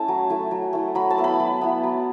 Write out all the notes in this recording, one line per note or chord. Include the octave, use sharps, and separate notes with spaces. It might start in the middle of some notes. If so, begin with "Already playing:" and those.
Already playing: A3 C#4 E4 A5
F#3
A3 E4
F#3
A3 E4
F#3 B5
A5
B3 E4
B5
F#3
B3 E4
F#3